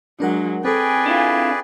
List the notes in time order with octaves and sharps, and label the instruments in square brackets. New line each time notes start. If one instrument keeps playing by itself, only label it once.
[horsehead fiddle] F#3 G#3 [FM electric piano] D4 A#4 F#5
[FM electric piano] C4 A4 [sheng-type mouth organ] G#4 B4 D5 [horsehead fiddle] G5 G#5
[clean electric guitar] D4 E4 F4